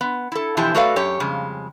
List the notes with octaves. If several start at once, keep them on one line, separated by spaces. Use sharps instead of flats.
B3
E4 A4
B2 E3 F3 E4 G4 A5
A3 F#4 A4 B4 D5 F5
F#2 G4 C#5
F2 C#3 G3 G#3